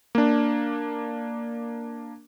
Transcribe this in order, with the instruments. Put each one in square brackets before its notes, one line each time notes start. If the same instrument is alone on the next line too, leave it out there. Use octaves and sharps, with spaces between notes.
[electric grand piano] A#3 D4